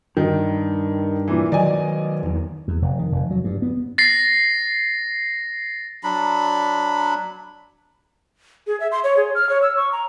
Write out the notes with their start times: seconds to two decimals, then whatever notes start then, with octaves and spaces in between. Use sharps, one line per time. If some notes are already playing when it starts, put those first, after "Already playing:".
0.17 G2 D#3
1.28 A#2 E3
1.52 D#3 F#3 D5 D#5 G#5
2.23 E2 D#3
2.68 E2
2.82 F1
2.99 D#3
3.12 F1
3.31 F#3
3.44 G2
3.62 B3
3.98 A6 A#6 C7
6.03 F#3 D4 B5
8.67 G#4
8.80 E5
8.92 C6
9.04 C#5
9.17 G#4
9.35 F6
9.49 C#5
9.62 E6
9.77 C#6
9.92 A#5